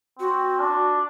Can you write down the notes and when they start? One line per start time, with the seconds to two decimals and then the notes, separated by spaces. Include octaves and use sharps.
0.19 C4 F#4
0.60 D4